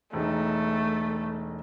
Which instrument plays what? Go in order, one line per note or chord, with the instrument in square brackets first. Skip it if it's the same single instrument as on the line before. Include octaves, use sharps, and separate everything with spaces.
[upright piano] E1 D#4 [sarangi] A3